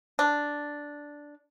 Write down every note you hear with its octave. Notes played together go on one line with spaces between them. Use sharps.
D4